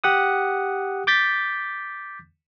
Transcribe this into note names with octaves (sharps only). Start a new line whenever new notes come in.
G4 F#5 D#6
D6 G6 A6 B6